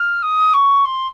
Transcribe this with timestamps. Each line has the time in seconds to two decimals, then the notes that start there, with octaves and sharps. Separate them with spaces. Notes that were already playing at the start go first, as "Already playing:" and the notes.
Already playing: F6
0.22 D#6
0.53 C#6
0.85 C6